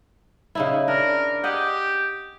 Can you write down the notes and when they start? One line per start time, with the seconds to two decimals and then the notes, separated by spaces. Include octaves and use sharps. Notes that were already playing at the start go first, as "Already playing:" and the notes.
0.55 C#3 D#4 E4
0.88 D4 A#4
1.44 G4 G#4 D#5 F#5